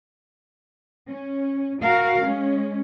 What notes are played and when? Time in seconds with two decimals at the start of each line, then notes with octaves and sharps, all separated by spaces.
1.09 C#4
1.82 F#4 A#4 F5
2.23 G#3 C#4